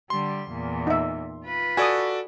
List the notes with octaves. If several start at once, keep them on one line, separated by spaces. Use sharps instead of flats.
D3 G3 C6
E2 A#2
D#4 E5
F4 B4
F#4 A4 D5 G#5 D#6